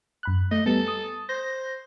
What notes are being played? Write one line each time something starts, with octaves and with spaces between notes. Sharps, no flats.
F#2 B5 F#6
A3 D#5
G3 B3 A4
D#6
C5 A#6